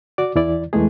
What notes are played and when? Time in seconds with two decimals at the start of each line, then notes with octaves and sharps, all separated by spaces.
0.18 F#4 D5 D6
0.35 E2 E3 E4 D5
0.73 E2 E3 G#3 A3 G#4